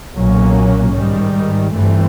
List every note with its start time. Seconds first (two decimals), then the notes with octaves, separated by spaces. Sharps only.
0.15 B1 A#2 F#3 A#3 C#4
0.93 G#2 D#3 G3
1.72 G1 G2 E3 A3 C4